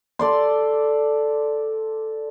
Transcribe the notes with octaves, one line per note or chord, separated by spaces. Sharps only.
A4 D5 C6